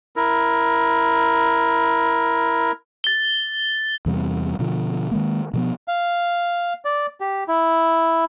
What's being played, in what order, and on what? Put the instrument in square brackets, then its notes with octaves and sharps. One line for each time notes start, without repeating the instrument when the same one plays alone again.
[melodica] E4 A#4
[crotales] A6 G7
[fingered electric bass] E2 C3 G3
B2 D3 F3
D#3 G#3 A#3
B2 F3 B3
[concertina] F5
D5
G4
E4